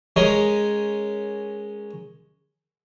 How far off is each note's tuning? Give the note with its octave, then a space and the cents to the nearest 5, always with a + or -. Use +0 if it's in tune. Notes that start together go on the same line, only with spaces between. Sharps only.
G#3 +0 C#4 -5 A#4 +0